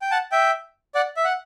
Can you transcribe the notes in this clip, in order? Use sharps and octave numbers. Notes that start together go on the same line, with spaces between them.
G5
F#5 A5
E5 G5
D5 F#5
E5
F#5